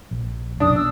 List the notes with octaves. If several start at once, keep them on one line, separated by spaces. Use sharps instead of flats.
A#1
F1 B1 F#2 D4 D#6
B2 E6